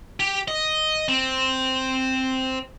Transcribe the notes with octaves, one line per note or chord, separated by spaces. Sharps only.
G4
D#5
C4